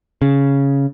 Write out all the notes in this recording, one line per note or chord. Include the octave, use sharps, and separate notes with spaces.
C#3